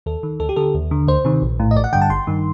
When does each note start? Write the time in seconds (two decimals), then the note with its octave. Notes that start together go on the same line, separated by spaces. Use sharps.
0.06 D#2 A4
0.23 D#3
0.40 D2 A4
0.49 G4
0.56 D3 A4
0.74 D#2
0.91 D3
1.08 D2 C5
1.25 C3 D#3
1.42 A#1
1.60 A2
1.71 D#5
1.76 A1 D5
1.84 F#5
1.93 G2 D3 G5
2.02 A5
2.10 G1 C6
2.27 G2 D#3